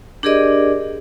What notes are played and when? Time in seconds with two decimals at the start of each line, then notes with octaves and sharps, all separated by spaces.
0.23 D4 G4 G#4 A#4 D5 D#5